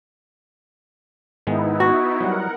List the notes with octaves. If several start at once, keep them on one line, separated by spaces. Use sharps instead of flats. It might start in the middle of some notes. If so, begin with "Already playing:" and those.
G#2 D#3 G#3 B3 D#4 E4
F#4
F#3 G3 A#4 F#5